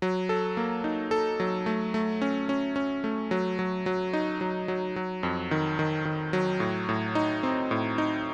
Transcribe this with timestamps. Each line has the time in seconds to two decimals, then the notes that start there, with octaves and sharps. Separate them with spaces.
0.02 F#3
0.29 A4
0.57 A#3
0.84 D#4
1.11 A4
1.40 F#3
1.66 A3
1.94 A3
2.22 C#4
2.49 C#4
2.76 C#4
3.04 A3
3.31 F#3
3.59 F#3
3.86 F#3
4.13 D#4
4.41 F#3
4.68 F#3
4.96 F#3
5.23 F2
5.51 D#3
5.79 D#3
6.05 D#3
6.33 F#3
6.60 A2
6.89 A2
7.15 D#4
7.43 C4
7.71 A2
7.98 D#4